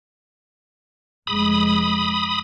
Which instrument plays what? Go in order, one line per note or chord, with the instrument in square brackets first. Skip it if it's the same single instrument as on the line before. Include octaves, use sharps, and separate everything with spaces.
[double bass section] F1 G#3 [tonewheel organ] B5 D#6